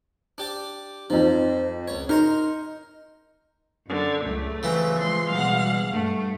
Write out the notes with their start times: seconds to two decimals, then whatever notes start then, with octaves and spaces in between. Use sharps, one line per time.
0.38 D4 G4 D5
1.10 F2 F3 D#4
1.88 C#2 C#5
2.09 D#4 A#4 A#5 C6
3.87 F#2 D3
4.24 C#2 A3
4.63 C#3 E3 F#3 C4
4.99 F3 G#3 C6
5.30 B2 G3 G#3 F5 F#5
5.92 G2 A3